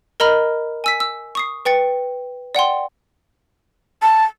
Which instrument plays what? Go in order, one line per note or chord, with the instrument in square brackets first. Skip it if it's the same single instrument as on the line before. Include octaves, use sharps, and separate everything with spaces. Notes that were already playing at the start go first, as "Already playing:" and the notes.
[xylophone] A#4 D#5 A#5 B5 F6
G#5 E6 B6
E6
C#6 D#6 C7
B4 G5 A6 C#7
D5 F#5 G5 C6
[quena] A5